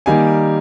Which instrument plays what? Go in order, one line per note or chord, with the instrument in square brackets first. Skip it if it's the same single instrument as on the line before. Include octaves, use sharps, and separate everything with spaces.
[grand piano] D#3 G3 A#3 F5 G#5